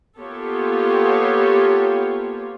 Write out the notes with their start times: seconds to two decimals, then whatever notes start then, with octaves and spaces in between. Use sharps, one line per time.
0.19 A#3 B3 F4 G4 A4 C#5